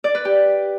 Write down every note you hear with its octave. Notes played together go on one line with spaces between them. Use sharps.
D5
B4
G4